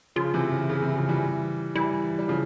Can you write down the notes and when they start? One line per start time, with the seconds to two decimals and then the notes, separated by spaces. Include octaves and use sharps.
0.16 C#3 F3 F4
0.34 C3 E3
0.51 C#3
0.69 C#3
0.82 C3 E3
0.96 C#3 F3
1.09 E3 G3
1.75 E3 G3 E4
2.19 G3
2.28 C#3 F3